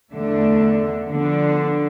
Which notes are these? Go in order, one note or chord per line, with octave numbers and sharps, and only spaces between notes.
E2 D3 A3 D4
D3 F3 B3 D4